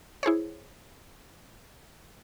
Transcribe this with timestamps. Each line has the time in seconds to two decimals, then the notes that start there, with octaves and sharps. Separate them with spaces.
0.23 E4 G#4 C5 C#5